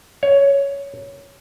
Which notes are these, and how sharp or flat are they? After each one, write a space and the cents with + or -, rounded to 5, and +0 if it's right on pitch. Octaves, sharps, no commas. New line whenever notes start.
C#5 +10